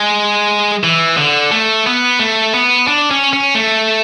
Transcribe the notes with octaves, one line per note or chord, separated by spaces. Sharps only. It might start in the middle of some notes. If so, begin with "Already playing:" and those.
Already playing: G#3
E3
D3
A3
B3
A3
B3
D4
C#4
C#4
A3